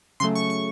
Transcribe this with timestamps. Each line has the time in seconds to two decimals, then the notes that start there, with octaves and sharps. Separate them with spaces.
0.20 C#3 F#3 A3 C6
0.35 C#6
0.50 C#6